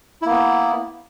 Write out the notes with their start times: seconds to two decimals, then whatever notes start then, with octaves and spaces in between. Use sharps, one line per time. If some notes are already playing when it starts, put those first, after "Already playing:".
0.22 E4
0.26 A#3
0.30 B3